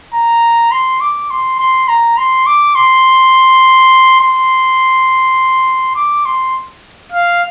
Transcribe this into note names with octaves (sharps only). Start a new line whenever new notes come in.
A#5
C6
D6
C6
C6
A#5
C6
D6
C6
C6
D6
C6
F5